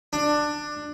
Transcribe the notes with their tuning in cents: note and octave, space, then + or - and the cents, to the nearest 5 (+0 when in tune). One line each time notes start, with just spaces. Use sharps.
D4 +15